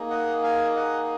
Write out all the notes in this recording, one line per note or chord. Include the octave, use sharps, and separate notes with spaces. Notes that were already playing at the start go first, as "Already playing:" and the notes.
Already playing: A#3 D#4 G#4
D#5 F#5
F5 G#5
D#5 F#5